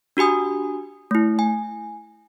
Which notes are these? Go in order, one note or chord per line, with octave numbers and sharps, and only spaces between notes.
D4 F#4 G4 G#5 D#6
A3 E4
G#5